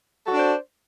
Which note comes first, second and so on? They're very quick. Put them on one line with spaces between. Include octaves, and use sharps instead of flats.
A4 F#4 D4 D5 C5